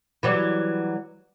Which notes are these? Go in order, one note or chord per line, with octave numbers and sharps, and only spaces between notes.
E3 F#3 G3